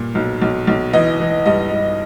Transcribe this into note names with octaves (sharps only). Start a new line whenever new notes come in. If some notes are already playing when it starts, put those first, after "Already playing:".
Already playing: G2 A#2
B1
B1
B1
E3 D#5
E3
G2 D#5
G2